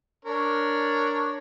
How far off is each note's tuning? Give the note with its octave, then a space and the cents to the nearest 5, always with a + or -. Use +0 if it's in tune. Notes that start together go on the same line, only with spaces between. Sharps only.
D4 +0 A#4 +0 C#5 +0